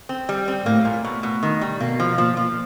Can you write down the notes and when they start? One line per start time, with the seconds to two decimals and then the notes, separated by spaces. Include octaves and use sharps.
0.09 C4
0.29 G3
0.48 C4
0.66 A2 A#3
0.85 A#2
1.05 B2
1.23 B2
1.43 D#3
1.61 G3
1.80 B2 A#3
2.00 F3
2.18 A#2 F3
2.37 F3